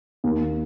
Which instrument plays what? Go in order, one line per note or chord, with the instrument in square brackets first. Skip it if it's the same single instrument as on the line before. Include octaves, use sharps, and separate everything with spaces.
[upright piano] D#2